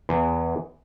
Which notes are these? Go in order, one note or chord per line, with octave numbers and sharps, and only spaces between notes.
E2